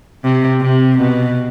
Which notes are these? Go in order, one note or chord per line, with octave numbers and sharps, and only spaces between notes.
C3
C3
B2